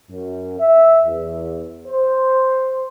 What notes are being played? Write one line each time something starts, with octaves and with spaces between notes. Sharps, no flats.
F#2
E5
E2
C5